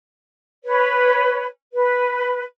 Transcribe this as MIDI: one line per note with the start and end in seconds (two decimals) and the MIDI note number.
0.64 1.43 71
0.64 1.43 73
1.72 2.41 71